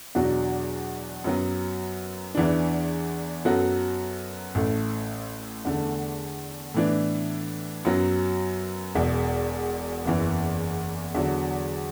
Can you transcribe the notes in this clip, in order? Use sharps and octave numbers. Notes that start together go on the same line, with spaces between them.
E2 B2 F#3 D4 F#4
F#2 F#3 B3
E2 E3 D4
F#2 F#3 B3 F#4 A4
A1 A2 A3
E2 D3 A3
A2 E3 B3 D4
F#2 F#3 B3
E1 E2 B2
F#1 E2 E3
E2 D3 F#3